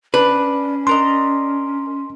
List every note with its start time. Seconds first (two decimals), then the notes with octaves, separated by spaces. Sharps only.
0.14 C#4 D4 B4
0.87 D4 A#4 D#5 C6